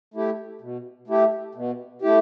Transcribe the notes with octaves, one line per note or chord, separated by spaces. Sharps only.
A3 E4 G4
B2
A3 E4 G4
B2
A3 E4 G4